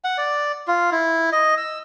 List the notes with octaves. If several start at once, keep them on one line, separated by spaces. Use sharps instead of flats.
F#5
D5
F4
E4
D#5
E6